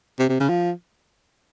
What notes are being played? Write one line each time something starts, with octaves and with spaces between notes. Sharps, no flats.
C3
C3
C#3
F3